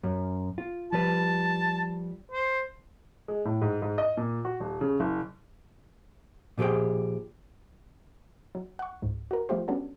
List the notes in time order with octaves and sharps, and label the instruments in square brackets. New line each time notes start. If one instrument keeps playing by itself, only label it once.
[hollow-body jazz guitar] F#2
F4
[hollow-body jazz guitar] F3 G3 B4 [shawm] A5
[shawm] C5
[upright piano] G#3
A2
G#2
G#2
D#5
A#2
F#4
D#1
C#3
F#1
[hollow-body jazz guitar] A#2 F3 G4 G#4 G5
[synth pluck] F#3
F#5 C#6
C#2 G#2
F#4 A#4
F3 G3 A3 F4 G4 C5
G3 B3 C#4 D4 F#4 A4